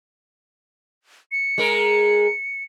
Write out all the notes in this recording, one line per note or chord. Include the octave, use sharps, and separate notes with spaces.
C#7
G#3 A#4